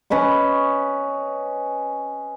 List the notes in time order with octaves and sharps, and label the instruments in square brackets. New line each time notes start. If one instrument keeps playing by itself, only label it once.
[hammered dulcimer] C#4 B4 D#5 C#6